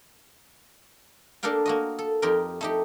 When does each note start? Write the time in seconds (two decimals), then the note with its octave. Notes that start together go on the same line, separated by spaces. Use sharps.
1.43 A#3 D4 A4 A#4 F5 G5
1.66 A#3 F#4 D#5
1.99 A4
2.22 F2 D#4 G4 A#4 G5
2.61 A3 D#4 G4